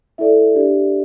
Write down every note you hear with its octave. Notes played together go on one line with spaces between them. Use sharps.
E4 A4 D5 E5
D4 G4 D5